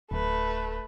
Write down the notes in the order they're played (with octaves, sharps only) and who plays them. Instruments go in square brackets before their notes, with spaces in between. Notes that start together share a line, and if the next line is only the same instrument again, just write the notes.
[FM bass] D1 [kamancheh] A3 B4